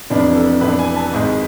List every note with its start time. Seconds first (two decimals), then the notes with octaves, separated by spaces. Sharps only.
0.10 F1 F2 E3 B3 D4
0.36 A4
0.61 F1 F2 E3 B3 D4 B4
0.79 G#5
0.96 A5
1.13 G#1 G#2 G#3